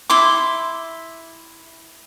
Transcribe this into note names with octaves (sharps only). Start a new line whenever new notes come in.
E4 C6 D6